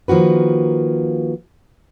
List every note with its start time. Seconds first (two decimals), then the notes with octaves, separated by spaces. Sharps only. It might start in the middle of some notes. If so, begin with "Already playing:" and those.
0.08 D#3 F3 A#3 F#4 B4